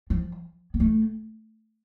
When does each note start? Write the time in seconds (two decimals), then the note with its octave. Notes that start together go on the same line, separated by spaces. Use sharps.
0.10 F3
0.74 B3
0.80 A3